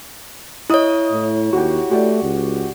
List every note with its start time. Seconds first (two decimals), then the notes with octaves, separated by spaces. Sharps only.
0.70 E4 C#5 D#5 D#6
1.12 A2
1.53 D#2 F#4 G4
1.91 A3 F#4 G4 D5
2.23 C#2